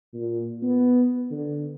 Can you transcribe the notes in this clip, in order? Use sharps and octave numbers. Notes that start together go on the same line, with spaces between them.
A#2
B3
D3